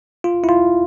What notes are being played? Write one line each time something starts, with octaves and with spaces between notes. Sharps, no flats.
F4
E4
F4